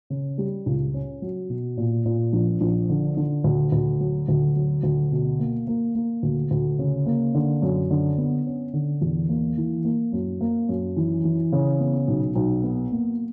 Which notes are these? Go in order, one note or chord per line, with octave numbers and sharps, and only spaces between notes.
C#3
G3
C#2
C#4
F#3
B2
A#2
A#2
A#1
A#1
D3
D3
D2
D2
F#3
D2
F#3
D2
B2
A#3
A#3
A#3
D2
D2
C#3
A#3
D3
F#2
D3
B3
C#4
D3
E2
A#3
E3
A#3
F#2
A#3
F#2
E3
E3
C#3
B3
B1
B1
B3
A#3